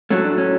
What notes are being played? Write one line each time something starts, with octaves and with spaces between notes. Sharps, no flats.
A2 F#3 A3 C#4
D4
C#4